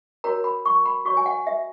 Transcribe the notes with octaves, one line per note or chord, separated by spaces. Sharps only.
F#4 A#4 C#5 A#5
B5
C#6
B5
F#4 C#5 C#6
G#5
F#5
E5